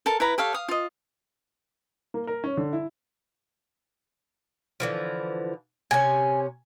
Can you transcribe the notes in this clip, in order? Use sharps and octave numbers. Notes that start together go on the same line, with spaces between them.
A4 A#4 A5
E4 B4 A#5
G4 A4 C#5 F5
F5 D#6
F4 D#5
A#3
A#4
C#4
D3
E4
D3 E3 F3
C3 C#4 G#5